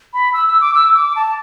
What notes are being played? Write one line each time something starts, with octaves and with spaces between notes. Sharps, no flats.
B5
E6
E6
D6
E6
D6
A5